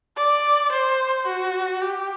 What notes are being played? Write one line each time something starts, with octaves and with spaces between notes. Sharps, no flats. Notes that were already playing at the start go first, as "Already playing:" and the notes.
D5
C5
F#4
G4